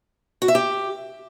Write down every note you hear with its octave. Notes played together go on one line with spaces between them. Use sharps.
F#4
E5
G4